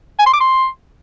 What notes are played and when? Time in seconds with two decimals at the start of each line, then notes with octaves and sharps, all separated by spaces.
0.19 G#5
0.26 C6
0.34 D6
0.41 C6